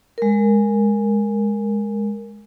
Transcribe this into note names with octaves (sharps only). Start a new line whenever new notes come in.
G#3 A#4